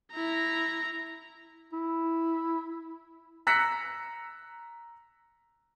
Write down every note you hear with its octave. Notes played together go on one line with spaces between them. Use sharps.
E4 A#5
E4
A#5 E6 F#6 A#6 B6 C#7